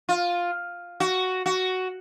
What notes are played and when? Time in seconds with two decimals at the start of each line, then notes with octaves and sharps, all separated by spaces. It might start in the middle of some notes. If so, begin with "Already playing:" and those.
0.09 F4
1.00 F#4
1.46 F#4